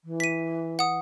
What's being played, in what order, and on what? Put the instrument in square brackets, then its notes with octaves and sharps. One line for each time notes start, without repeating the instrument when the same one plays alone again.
[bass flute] E3
[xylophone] B6 D#7
F#5 D#6